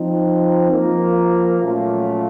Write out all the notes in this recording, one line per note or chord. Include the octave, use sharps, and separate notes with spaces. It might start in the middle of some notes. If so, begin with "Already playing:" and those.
Already playing: F3 C4 D#4
F3 A#3 F4
A#2 F#3 A3 C#4 F4